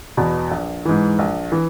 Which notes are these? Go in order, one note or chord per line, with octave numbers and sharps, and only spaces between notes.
E2 B2
A#1
G#2 E3
A#1
E3